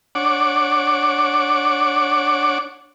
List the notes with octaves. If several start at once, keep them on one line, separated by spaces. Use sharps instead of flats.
D4 C#5 F#5 D6